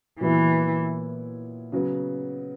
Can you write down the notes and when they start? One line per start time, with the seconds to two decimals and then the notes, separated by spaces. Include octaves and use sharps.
0.20 A#2 E3 F#3 B3 E4
1.72 C#3 F#3 B3